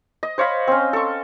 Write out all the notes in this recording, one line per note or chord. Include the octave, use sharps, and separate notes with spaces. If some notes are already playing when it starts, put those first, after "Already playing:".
D#5
C5 C#5 F5 B5
C4 C#4
A4 C#6